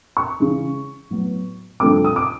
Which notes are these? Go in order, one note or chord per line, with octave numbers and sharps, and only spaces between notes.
C#6
C#3 E3 G#3
A2 F#3 B3
G2 D3 F3 A3 C4 D6
D#6
D6